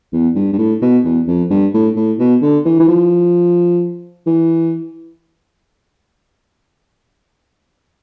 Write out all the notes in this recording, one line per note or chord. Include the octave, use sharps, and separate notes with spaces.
E2
G2
G2
A2
B2
E2
F2
G2
A2
A2
B2
D3
E3
E3
F3
E3